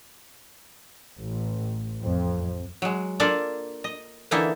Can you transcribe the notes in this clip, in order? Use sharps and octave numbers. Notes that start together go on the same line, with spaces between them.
A1
F2
F#3 G#3
A#3 D4 F4 A4 D5
D#5
D3 E3 A#3 D#4 E4 A4